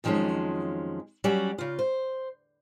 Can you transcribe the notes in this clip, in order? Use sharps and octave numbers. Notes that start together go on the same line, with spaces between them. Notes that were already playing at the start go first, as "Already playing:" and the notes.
F2 D#3 F3 F#3 G#3 C#4
F#3 G3 C#4 F#4 D5
C#3 F4
C5